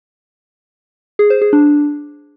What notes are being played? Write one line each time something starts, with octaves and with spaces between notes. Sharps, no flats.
G#4
C5
G#4
D4